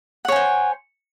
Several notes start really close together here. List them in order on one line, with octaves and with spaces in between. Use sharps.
F#5 C#5 G#5 C5